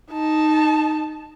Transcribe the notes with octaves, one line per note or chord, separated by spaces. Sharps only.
D#4 A5